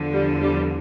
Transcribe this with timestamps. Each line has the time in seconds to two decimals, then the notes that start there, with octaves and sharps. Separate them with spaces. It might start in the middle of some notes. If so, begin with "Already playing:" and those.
Already playing: E2 D3 F3
0.13 G3
0.41 G3